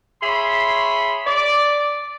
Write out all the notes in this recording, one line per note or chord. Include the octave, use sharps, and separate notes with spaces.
G#4 C#5 E5 B5 C6
D5